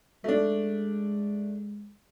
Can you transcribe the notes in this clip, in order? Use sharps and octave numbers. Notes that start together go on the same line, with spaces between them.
G#3 A3 D4